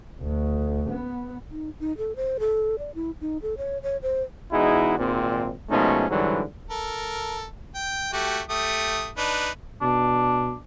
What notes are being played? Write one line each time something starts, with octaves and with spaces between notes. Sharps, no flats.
D2
B3
D#4
D#4
A4
C5
A4
D5
E4
D#4
A4
C#5
C#5
C5
E2 G#3 D#4 E4 F#4 G#4
G#1 A#2 C4
B2 F3 G#3 A3 C#4 D#4
G#2 D3 E3 F#3 G3
A4 A#4
G5
A3 F#4 G4
A3 G4 D#6
D4 D#4 B4
B2 D4